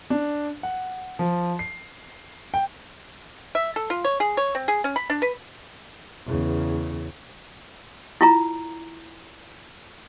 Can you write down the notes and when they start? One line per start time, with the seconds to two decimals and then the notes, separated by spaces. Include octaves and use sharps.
0.10 D4
0.63 F#5
1.19 F3
1.59 C7
2.54 G5
3.55 E5
3.76 A4
3.90 F4
4.04 C#5
4.20 G#4
4.37 C#5
4.55 C4
4.68 G#4
4.84 C#4
4.96 B5
5.10 D4
5.22 B4
6.26 E2 C#3
8.21 E4 F4 A#5